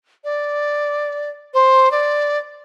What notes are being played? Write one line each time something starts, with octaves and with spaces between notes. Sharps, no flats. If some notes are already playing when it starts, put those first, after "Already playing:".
D5
C5
D5